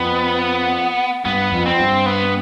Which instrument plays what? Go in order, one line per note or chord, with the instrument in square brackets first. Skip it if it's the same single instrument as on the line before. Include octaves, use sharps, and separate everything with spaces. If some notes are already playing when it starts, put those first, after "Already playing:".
Already playing: [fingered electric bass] F2 [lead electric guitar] B3
[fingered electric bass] G2 [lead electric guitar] B3
[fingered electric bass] F2
[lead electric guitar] C4
[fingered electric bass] G2
[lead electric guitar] B3